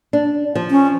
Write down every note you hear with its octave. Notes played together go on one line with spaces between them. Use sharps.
D4
F3
C#4